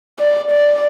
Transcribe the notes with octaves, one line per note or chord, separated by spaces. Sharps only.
D5
D5